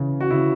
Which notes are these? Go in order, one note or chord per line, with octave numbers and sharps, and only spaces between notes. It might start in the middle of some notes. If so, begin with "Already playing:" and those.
Already playing: C#3 E3
F#4
C#3 E4